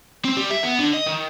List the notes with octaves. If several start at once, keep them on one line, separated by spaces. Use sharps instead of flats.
C4
G3
E5
B3
D3
D#5
D#3